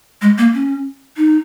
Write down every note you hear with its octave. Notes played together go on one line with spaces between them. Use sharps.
G#3
A#3
C#4
D#4